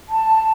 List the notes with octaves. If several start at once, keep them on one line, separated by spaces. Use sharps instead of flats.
A5